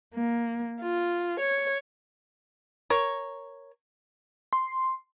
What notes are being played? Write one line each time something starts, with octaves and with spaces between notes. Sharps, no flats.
A#3
F4
C#5
A#4 C#5
C6